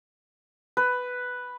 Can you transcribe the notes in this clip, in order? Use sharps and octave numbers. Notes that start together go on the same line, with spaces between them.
B4